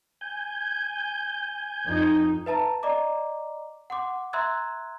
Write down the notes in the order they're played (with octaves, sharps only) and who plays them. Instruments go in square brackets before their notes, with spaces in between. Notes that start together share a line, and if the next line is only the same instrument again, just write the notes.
[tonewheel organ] G#5 G6
[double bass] F2 D#4
[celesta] B4 E5 A5 A#5
D5 D#5 A#5 D6
F#5 C6 D6
E5 A#5 C6 E6 F#6 G#6